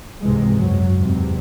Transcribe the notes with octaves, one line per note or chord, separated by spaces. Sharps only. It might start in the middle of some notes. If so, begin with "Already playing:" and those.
C#2 G#2 C3 E3 G#3
F#2 F#3
E2 G#2 C3